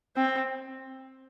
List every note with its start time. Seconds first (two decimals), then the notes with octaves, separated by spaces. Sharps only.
0.17 C4